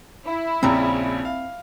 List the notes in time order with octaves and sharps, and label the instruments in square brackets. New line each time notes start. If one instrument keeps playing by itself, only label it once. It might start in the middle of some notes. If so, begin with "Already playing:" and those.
[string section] E4
[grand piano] A#1 C#3 [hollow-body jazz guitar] C4 A#5
[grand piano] F5